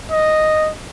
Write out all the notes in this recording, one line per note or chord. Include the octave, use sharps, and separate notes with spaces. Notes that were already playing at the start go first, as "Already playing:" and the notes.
D#5